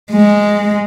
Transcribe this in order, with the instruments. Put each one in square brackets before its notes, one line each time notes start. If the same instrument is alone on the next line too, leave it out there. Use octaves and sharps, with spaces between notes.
[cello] G#3